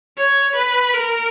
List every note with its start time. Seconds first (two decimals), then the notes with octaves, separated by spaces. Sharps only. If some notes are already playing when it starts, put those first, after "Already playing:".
0.17 C#5
0.55 B4
0.94 A#4